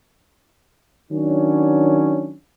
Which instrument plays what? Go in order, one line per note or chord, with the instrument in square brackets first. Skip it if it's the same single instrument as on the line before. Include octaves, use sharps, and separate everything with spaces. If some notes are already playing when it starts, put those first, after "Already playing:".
[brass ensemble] D#3 F#3 C#4 D4